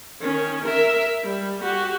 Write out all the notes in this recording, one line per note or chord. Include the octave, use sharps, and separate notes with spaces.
D#3 C#4
A#4 E5
G3
F#4 G4